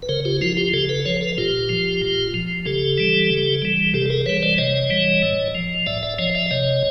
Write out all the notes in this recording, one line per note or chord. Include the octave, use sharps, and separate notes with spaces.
B4
C#3 A#4 C5
F4 G4
F3 E4 F#4
F4 G4
C#3 G4 A4
A4 B4
F3 B4 C#5
A4 B4
A#2 F4 G4
F3
A#2
F3
C#3 G4 A4
E3 G3
C#3
E3 G3
C3 G4 A4
A4
G#4 A#4
E3 G3 B4 C#5
C5 D5
C3 C#5 D#5
E3 G3
A2
F3
A2 D5 E5
D5 E5
F3 C#5 D#5
D5 E5
C3 C#5 D#5